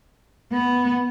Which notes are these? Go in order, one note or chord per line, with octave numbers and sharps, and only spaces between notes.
B3